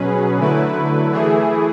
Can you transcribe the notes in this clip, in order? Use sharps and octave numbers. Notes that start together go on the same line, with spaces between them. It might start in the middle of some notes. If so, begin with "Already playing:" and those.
Already playing: B2 F#3 C#4 G#4 B4
D3 F#3 A3 E4 B4
E3 A3 E4 G#4